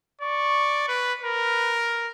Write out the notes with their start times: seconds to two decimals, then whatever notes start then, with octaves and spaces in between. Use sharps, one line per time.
0.21 D5 C#6
0.88 B4
1.22 A#4 B4